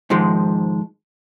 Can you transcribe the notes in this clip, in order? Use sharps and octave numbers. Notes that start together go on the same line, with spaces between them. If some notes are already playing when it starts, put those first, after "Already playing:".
G#2 D#3 F3 G#3